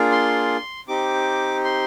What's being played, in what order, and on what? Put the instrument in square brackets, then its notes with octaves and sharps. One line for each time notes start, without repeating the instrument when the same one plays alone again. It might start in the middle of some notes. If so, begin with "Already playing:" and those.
Already playing: [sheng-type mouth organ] A#3 D4 F4 G#4
C6
C4 D#4 G4 D6
C6